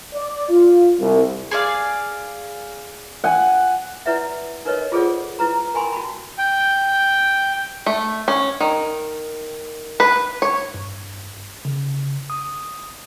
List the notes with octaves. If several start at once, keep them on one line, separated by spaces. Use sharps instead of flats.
D5
F4
C2
G#4 D5 F5
F#5 G#5
E4 B4 D5 E5 F#5
D#4 A#4 B4 C#5 D#5
F4 G#4 A4 C5 D5 F#5
E4 B4 A#5
A#4 G5 G#5 B5 C6
F#4 A5 B5
G5
A3
C#4
D#3
B4
C#5
G2
C#3
D#6